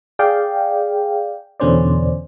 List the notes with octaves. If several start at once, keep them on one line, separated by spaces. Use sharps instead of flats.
G#4 D5 F5 G5
E2 B2 D3 C#4 C5 D5